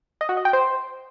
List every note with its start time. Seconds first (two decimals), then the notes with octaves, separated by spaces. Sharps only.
0.21 D#5
0.29 F#4
0.37 D#5
0.45 G5
0.53 C5